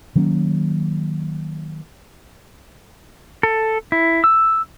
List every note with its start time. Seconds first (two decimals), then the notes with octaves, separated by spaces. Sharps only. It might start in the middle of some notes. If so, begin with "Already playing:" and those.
0.15 D#3 F#3 A#3 C#4
3.43 A4
3.92 E4
4.24 E6